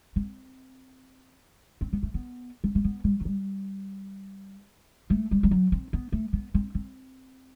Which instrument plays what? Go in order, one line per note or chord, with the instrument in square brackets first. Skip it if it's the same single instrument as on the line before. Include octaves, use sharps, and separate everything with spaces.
[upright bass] C4
C4
B3
A3
B3
C4
A3
B3
G3
F#3
G3
A3
G3
G3
F#3
C4
B3
A3
B3
C4
C4